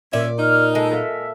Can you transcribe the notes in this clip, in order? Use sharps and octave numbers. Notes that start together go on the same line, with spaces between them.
A#2 C#4 D5 E5
D#4 F6
G#3 A4
A4 E5 F5